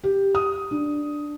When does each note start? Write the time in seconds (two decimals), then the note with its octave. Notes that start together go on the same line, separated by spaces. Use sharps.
0.04 G4
0.35 D#6
0.71 D4